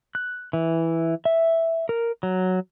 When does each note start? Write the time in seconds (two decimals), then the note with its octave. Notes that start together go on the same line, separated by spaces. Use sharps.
0.15 F#6
0.53 E3
1.25 E5
1.89 A#4
2.23 F#3